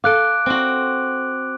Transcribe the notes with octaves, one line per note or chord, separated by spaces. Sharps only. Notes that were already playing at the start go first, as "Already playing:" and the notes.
A4 F5 D6 F#6 D7
C4 F#4